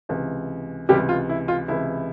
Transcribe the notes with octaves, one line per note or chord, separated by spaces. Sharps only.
C#2 C3 E3
C#2 C3 E3 G3 G4
F4
E4
F4
C#2 C3 E3 E4